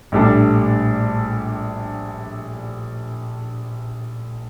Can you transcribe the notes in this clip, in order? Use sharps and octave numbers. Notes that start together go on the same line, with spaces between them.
A#1 A2 G3 D4 A4